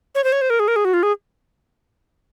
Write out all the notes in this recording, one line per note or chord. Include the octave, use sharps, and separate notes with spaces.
C#5
C5
C#5
C5
A#4
G#4
A#4
G#4
F#4
F4
G#4